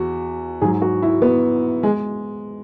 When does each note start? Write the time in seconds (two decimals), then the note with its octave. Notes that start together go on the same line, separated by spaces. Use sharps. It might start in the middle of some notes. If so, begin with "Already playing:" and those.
Already playing: E2 F#4
0.61 G#2 F#3 G#4
0.81 F#4
1.02 E4
1.22 B3
1.83 G#3